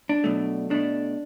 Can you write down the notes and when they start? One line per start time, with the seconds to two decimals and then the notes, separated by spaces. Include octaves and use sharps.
0.09 D4
0.24 B2 F#3 A3
0.70 B2 A3 D4